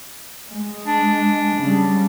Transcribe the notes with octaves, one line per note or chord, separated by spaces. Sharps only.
G#3
D4
C#3 G3